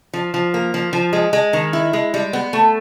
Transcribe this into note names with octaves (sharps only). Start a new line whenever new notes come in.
F3
F3
A#3
F3
F3
G#3
G#3
D#3
E4
G#3
G3
B3
A3